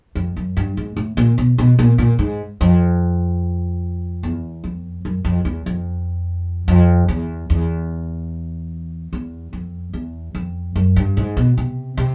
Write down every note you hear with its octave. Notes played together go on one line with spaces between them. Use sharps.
F2
F#2
G2
G#2
A2
A#2
B2
B2
A#2
A#2
G#2
F2
E2
F2
F#2
F2
E2
F2
F2
E2
E2
E2
F2
E2
F2
F#2
G2
G#2
B2
C3
C3